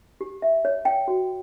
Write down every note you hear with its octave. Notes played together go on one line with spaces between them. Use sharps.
G4
E5
C#5
G5
F#4